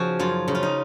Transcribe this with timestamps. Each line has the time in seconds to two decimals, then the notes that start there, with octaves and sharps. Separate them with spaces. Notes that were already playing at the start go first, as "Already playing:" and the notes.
Already playing: C#3 F3 D#4 F#4 G#4
0.19 F#2 F4
0.48 C#3
0.55 F4
0.63 D#4